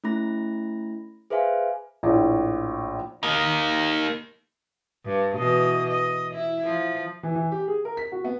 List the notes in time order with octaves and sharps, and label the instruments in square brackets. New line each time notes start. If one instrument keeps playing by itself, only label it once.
[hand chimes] A3 C#4 E4 B5 A#6
G#4 B4 C5 E5 F5 G#5
[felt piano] A#1 A2
[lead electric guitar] A#3 D#4
[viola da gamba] G2
B2 E3 D#5
D#5
E4
F3
[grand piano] E3
E3
G4
G#4
A#4
B6
F#4
B3